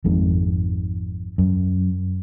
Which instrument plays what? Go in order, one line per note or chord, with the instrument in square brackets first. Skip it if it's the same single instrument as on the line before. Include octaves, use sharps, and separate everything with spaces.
[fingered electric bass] G#1 F2 G#2
F#2